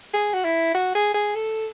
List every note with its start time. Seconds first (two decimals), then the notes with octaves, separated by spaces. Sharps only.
0.13 G#4
0.33 F#4
0.44 E4
0.74 F#4
0.95 G#4
1.14 G#4
1.35 A4